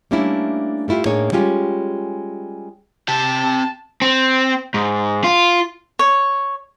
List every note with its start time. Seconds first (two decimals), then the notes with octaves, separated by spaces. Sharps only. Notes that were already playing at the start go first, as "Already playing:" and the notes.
0.11 G3 A3 A#3 C#4 D4 E4
0.88 G3 A3 E4 F4 G4
1.06 A2 A#3 D4 D#4 G#4 C#5
1.32 G3 G#3 C#4 F4 G4
3.08 C3 G4 A5
4.02 C4
4.74 G#2
5.24 F4
5.99 C#5